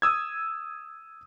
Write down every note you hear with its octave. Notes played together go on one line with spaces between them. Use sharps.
D#6 E6 G#6